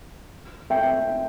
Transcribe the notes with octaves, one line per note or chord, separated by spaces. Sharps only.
E5 G5